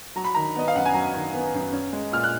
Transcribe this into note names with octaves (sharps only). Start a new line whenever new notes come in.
F#3 A#5
B5
D#3 A#5
B3 D#5
F5
F#2 F#5
G#5
F#3 A#5
D#3
B3
F#2
C#4
G#3
A#2 F6
F#6